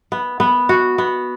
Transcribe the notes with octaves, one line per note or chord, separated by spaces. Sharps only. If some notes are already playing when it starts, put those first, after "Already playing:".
B3
B3
F#4
B3